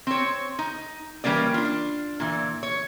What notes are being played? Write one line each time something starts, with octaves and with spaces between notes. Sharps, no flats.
C4 C#5
D#4
E3 G3 A#3 C#4 D5
D4 F4
A#2 E3
C#5